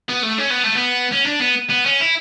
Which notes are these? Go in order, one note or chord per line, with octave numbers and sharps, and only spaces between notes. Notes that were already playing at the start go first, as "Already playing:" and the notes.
B3
A3
C#4
B3
A3
B3
C#4
D4
B3
B3
C#4
E4